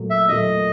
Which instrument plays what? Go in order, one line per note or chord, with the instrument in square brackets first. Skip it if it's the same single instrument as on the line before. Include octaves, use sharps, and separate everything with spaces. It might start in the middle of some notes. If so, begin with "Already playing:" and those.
Already playing: [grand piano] A#2 F#3 A3
[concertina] E5
[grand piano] A#2 F#3 A3 [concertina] D#5